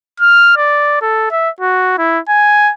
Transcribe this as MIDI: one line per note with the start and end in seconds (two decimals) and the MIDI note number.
0.20 0.54 89
0.57 0.98 74
1.01 1.30 69
1.31 1.50 76
1.60 1.94 66
1.98 2.19 64
2.29 2.72 80